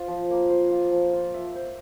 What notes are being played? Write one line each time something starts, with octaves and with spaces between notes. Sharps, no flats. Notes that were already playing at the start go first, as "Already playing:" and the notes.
Already playing: F4 C5
F3
A#3
C5
F4
F3
F4
E5
C5